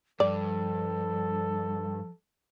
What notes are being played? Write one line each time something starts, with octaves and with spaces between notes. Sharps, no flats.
G2 F3 A4 D5